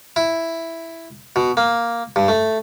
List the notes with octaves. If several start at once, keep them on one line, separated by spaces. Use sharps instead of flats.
E4
B2
A#3
G2
A3